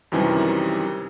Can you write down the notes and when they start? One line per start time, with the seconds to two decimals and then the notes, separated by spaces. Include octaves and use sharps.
0.12 F#2 C3 D#3 E3 G3